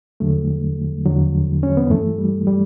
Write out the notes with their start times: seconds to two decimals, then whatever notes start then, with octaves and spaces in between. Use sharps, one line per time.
0.20 E2 D3 F#3 A3
1.06 E2 D3 F#3
1.63 C#4
1.77 B3
1.90 G2 E3 A3
2.18 G3
2.47 G3